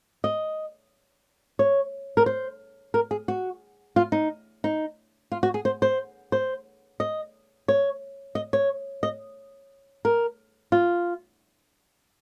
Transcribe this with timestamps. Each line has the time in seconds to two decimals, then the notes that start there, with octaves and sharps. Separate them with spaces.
0.24 D#5
1.59 C#5
2.17 A#4
2.26 C5
2.94 A#4
3.11 G#4
3.28 F#4
3.96 F4
4.12 D#4
4.64 D#4
5.32 F4
5.43 F#4
5.54 G#4
5.65 C5
5.82 C5
6.32 C5
7.00 D#5
7.68 C#5
8.35 D#5
8.53 C#5
9.03 D#5
10.05 A#4
10.72 F4